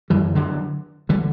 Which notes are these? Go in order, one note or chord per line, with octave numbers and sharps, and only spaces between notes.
F#2 D3 E3 G3
D3 F#3
D3 E3 G3